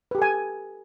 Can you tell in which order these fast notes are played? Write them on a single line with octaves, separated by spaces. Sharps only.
B4 G4 A4 G#5